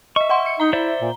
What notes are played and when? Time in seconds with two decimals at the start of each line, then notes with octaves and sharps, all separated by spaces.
0.16 D#5 E5 C#6
0.29 D#5 F#5 C6
0.46 C#7
0.60 D#4 A#5 G7
0.73 E4 C5 D5 E5
1.01 A#2